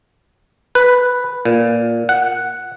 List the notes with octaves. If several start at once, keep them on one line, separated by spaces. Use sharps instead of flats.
B4
A#2
F#5